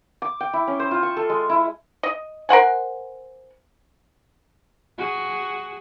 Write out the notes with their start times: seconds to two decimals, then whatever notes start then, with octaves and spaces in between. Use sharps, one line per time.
0.22 D6
0.40 G5
0.53 E4
0.67 C#4
0.80 C5
0.91 F4
1.03 C#6
1.17 A4
1.30 G#3
1.49 E4
2.03 D#5
2.49 A#4 C5 F#5 G#5
4.98 F#4 G#4